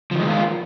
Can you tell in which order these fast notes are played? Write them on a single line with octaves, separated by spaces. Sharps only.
F3 D#3 G#3 A#3 F4